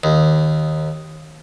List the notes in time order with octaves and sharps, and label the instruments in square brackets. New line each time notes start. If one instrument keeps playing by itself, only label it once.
[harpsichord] D#2